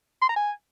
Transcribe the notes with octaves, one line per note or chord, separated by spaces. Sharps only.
C6
A#5
G#5